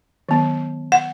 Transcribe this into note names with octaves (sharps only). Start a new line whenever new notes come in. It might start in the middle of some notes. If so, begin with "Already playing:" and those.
D#3 F#3 B3
F#5